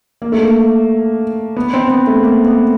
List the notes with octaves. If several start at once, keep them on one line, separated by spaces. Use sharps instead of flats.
A#3
A3
A#3
B3
C4
B3
A3
A#3
B3